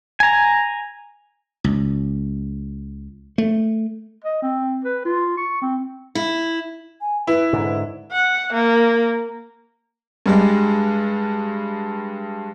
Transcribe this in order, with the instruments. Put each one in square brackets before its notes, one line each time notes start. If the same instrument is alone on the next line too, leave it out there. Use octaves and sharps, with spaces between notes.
[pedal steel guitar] G#5 A#5
[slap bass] C#2
A3
[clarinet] D#5
C4
B4
F4
C#6
C4
[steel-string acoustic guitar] E4
[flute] G#5
[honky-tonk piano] E4 [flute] B4
[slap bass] G#2 D3
[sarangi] F#5
A#3
[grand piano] G2 G3 G#3